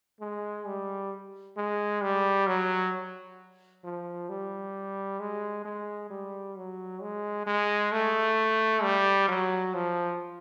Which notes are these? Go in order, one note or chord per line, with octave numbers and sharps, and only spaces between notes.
G#3
G3
G#3
G3
F#3
F3
G3
G#3
G#3
G3
F#3
G#3
G#3
A3
G3
F#3
F3